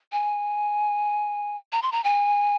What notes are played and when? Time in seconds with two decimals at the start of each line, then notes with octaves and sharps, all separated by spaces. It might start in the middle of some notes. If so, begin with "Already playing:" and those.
0.12 G#5
1.73 A#5
1.82 C6
1.92 A#5
2.04 G#5